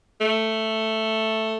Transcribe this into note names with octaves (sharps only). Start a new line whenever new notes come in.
A3